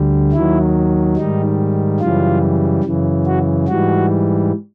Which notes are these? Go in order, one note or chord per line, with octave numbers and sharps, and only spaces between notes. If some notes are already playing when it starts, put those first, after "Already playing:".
Already playing: D2 D3 G3
D#2 D#3 F#3 E4
G#2 D#3 G3 D#4
F#2 C#3 E3 G3 F4
F#2 C#3 E3
F#4
G#2 E3 G3 F#4